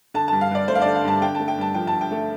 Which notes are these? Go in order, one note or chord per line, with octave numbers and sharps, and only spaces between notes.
D3 A5
G2 A5
F5
G2 D5
A3 C5
F5
D3 D5
F5
G2 A5
D3 G5
A3 A5
G5
G2 A5
F3 G5
A5
D3
G5
A3